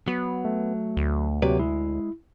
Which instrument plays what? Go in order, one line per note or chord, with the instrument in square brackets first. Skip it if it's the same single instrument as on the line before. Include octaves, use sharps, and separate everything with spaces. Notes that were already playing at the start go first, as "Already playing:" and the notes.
[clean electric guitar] F#3 [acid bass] B3
[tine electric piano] A3
[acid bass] D2
[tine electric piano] C3 F#3 G4 [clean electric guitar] A#3 B4 D5
[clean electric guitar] G#3 [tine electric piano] E4